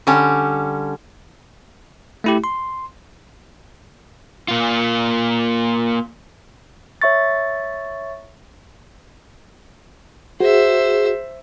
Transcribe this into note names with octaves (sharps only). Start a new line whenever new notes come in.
D3 G3 C#4
A3 E4 G4
C6
A#3 F4
C#5 E5 C#6 A6
F#4 G#4 C5 E5